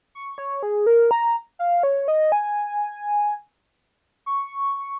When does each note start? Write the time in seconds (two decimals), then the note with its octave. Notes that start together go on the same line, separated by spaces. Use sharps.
0.15 C#6
0.38 C#5
0.63 G#4
0.86 A#4
1.11 A#5
1.59 F5
1.83 C#5
2.08 D#5
2.32 G#5
4.26 C#6